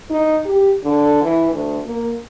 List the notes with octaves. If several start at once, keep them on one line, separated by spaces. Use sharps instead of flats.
D#4
G4
D3
E3
D2
A#3